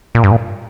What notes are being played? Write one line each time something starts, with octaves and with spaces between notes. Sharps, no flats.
A#2
G2
A#2